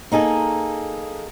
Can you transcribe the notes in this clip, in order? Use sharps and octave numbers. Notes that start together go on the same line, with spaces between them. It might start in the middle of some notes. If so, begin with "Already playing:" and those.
A#3 D#4 G#4 A4